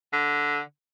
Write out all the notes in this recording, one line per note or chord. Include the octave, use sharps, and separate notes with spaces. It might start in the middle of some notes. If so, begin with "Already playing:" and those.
D3